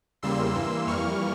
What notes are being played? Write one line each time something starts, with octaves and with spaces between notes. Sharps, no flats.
E2 C#3 G3 A#3 C6 E6
G2 E3 A#3
F2 E3 G3 A#3 C#6 F6